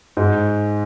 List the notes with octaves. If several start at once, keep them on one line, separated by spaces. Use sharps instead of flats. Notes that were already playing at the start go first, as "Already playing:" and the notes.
G#2